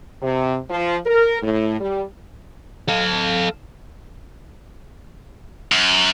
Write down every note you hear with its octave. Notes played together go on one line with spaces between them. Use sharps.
C3
F3
A#4
A2
G3
A4 F5
F#2